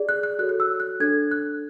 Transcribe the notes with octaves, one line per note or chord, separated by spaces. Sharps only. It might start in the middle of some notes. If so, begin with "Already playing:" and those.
Already playing: G#4 D5
F#6
F#6
F#4 A4 C#5 F#6
F#6
E6
F#6
D4 A4 C#5 G#6
F#6